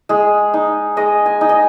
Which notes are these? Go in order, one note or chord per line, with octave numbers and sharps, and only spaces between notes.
G#3 G#4
D#4
G#3 D#5
G#5
D#4
D#5